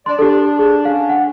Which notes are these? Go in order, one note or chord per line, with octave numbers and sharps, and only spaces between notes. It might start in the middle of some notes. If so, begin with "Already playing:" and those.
D4 D5 C6
D4 G4 A4
G#4
C#4 D4 F5
F#5